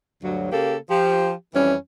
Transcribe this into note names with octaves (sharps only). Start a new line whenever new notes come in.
D2 G2 F#3
C#3 A#3 G4 A4
F3 G4
F2 E3 G3 C#4